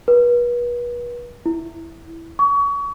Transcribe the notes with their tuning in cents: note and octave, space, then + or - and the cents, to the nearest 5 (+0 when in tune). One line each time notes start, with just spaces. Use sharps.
B4 -35
E4 +0
C#6 +30